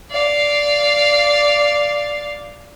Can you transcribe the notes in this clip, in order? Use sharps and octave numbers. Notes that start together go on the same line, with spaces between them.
D5 F5